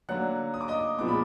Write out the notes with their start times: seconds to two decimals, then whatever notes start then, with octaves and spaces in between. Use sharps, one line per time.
0.09 D3 F#3 A#3 F#5 F#6
0.54 D#6
0.61 D6
0.68 D#5 D#6
0.99 A#2 F3 G#3 B3 D6
1.08 B5